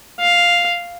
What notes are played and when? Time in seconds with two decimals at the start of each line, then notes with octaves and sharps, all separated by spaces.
0.20 F5